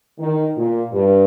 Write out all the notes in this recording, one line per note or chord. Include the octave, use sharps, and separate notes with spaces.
D#3
A#2
G2